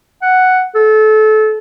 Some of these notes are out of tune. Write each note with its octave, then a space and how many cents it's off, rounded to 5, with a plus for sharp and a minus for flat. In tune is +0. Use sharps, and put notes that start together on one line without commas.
F#5 +0
A4 -25